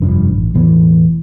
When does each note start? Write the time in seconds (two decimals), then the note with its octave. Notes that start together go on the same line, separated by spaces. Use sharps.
0.01 F1 G2 F3 D4
0.27 A1
0.54 E1 A2 E3 B3